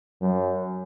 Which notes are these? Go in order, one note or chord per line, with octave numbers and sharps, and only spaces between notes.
F#2 F#3